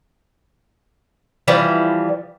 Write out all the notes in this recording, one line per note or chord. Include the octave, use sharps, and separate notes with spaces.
E3 F3 G3